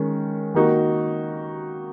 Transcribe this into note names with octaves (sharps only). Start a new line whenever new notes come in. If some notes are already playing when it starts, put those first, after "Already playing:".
Already playing: D#3 G#3 C#4
D#3 A#3 D#4 F#4